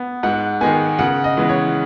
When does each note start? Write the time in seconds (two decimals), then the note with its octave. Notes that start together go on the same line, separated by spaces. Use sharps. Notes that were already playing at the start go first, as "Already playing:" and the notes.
Already playing: B3
0.23 G#2 F#5
0.61 D#3 G#3 B3 G#5
0.99 C#3 F#5
1.24 D#5
1.37 E3 G#3 B3
1.49 C#5